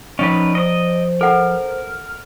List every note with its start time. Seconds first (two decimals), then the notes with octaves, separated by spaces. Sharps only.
0.19 F3 C#4 D#4 B4 D5
0.55 C5 D#5 D#6
1.21 A4 A#4 F#5